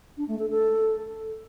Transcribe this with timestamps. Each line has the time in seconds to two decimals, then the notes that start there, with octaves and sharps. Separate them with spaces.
0.18 D4
0.28 A3
0.39 A4
0.50 A4